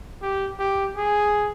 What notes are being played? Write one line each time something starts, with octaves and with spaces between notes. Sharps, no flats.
G4
G4
G#4